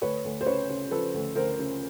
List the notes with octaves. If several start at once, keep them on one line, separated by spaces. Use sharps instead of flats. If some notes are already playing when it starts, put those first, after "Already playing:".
D2 B4 C#5
D2
C5
C#3 B4 C#5
C#3
F3 A4 B4
D2
D2 A#4 C5
C#3